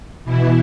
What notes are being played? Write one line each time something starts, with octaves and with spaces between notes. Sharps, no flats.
B2 E3 E4